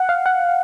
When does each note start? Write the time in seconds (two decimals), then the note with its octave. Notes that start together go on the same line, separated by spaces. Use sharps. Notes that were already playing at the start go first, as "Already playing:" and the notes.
Already playing: F#5
0.09 F5
0.26 F#5